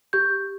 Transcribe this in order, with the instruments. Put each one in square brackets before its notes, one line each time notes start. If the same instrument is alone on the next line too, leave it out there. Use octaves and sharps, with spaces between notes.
[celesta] G4 G6